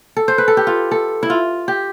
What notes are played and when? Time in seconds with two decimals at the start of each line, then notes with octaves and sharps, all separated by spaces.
0.17 A4
0.28 C5
0.38 B4
0.48 A4
0.57 G4
0.67 F4
0.91 A4
1.23 E4
1.30 F4
1.68 G4